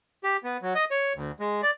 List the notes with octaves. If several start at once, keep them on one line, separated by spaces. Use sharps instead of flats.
G4
B3
F#3
D#5
C#5
D2
G#3
D5